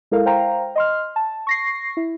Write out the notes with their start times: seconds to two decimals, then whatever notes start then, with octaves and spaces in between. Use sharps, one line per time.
0.11 G#3 E4 A4 A#4 F5
0.26 C5 F5 G5 A#5
0.76 D#5 C6 F6
1.16 A5
1.47 C#6 A#6 C7
1.97 E4